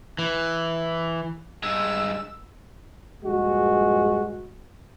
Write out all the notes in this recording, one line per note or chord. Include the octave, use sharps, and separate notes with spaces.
E3
G2 G#3 E6
A#1 G2 G#3 F#4